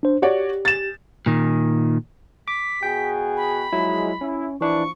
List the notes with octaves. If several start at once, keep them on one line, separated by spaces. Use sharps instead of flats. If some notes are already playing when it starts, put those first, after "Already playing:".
D4 C5
F#4 G4 C#5 D5
A6 E7
A#2 D#3
D6 B6
B2 F#4 G#4 G5
B5
F3 F#3 G#3 E4
C#4 E4
A#1 E3 F3 D4 E4 C#6